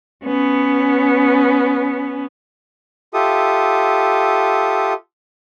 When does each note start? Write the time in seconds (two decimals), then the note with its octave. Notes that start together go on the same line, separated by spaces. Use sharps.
0.24 B3 C#4
3.14 F4 G4 A4 E5 D#6